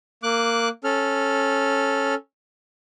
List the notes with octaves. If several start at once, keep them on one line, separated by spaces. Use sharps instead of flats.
A#3 D6 F#6
C#4 A4 F6